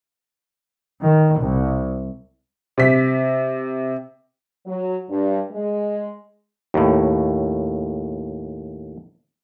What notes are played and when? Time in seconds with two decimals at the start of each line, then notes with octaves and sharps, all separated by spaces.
1.03 D#3
1.39 C2
2.78 C3 B6
4.67 F#3
5.10 G2
5.52 G#3
6.74 D#2 A2